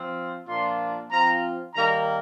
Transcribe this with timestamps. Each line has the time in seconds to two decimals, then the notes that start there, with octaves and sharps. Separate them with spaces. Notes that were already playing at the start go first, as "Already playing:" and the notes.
Already playing: F3 C4 F4
0.47 A#2 F3 A#3 D4 F4 C6
1.11 F3 C4 F4 A#5
1.75 D#3 G3 A#3 A#5